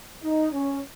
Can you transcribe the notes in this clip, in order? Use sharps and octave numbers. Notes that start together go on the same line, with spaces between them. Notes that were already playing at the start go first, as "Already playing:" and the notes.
D#4
C#4